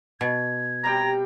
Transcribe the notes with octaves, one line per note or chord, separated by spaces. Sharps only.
B2 G#6
C3 G3 G5 A#5